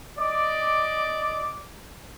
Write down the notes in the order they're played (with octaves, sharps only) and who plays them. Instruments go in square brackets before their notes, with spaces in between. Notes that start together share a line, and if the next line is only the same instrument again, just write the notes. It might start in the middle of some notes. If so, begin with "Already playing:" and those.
[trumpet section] D5 D#5 D6